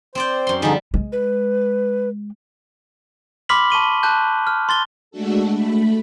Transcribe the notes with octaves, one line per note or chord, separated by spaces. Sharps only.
C4 C5 D5 G5
F#2 C6
D3 F3 G3 D#4 G#4
G#3
B4
B5 C6 D6 F6 B6 F#7
A5 C#6 D#7 G7
A5 F#6 G6
F6
C6 A6 G7
G#3 A3 D4 F#4 A4
A3 B5